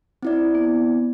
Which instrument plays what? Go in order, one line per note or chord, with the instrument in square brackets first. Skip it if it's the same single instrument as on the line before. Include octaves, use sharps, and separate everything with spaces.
[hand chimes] C4 E4 D5
[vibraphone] B3